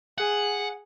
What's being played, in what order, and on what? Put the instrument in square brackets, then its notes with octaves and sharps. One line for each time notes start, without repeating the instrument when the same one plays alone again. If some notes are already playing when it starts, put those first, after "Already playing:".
[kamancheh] G#4 [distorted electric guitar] F#5